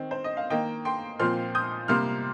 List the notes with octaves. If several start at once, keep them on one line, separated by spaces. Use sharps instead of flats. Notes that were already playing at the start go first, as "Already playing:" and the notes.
Already playing: D#3 C4
C5
D#5
F5
D#3 A#3 D#5 G5
G5 C6
A#2 F3 C4 C6 F6
D#6 G6
C3 G3 A#3 C6 F6